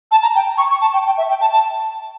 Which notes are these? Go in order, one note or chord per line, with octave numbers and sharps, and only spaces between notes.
A5
A#5
G5
C#6
C#6
A5
G5
G5
E5
G5
A5
A5